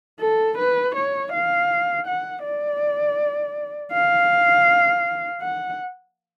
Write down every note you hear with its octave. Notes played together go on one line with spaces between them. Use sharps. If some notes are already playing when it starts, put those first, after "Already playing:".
A4
B4
C#5
F5
F#5
D5
F5
F#5